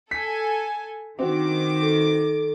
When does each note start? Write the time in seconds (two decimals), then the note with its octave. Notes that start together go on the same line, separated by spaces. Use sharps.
0.11 A4 G#5 B6
1.19 D#3 C4 D4 F#4 C5 D6
1.81 A4